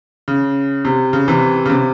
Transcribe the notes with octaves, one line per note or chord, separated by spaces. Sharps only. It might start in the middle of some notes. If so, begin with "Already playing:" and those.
C#3
C3
C#3
C3 E3
C#3
C3